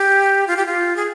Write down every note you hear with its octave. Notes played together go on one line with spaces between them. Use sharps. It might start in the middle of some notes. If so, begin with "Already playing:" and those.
Already playing: G4
F4
G4
F4
G#4